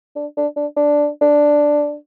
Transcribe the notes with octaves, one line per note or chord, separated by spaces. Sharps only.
D4
D4
D4
D4
D4